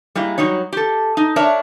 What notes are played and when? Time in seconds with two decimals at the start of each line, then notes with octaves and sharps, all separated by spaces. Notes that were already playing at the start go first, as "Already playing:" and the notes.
0.15 G3 G#3 A#3 E4
0.38 F#3 G3 D#4 C#5
0.73 G4 A4
1.17 D#4
1.36 D4 A#4 C#5 E5